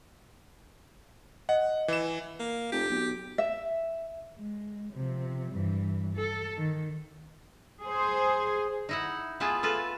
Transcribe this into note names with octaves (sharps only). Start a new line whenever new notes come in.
D#5 F#5
E3 E7
A#3
F1 G4
B1
E5
G#3
C3 F3
G2 E3
A4
D#3
G#4 C5
D#4 E4 F#5
B3 E4 F4 G#4 A5
F4 A4 B4